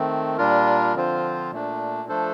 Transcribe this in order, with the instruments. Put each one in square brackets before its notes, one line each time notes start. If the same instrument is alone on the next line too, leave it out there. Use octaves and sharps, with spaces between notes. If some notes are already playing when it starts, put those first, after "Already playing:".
Already playing: [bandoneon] D#3 A3 C4
A#2 G3 D4 F4 A#4
D3 F3 C4 F4 C5
A#2 A3 D4
F3 A3 D4 A4 C5